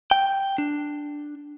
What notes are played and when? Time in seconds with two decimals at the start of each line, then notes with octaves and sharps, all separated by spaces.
0.11 G5
0.58 D4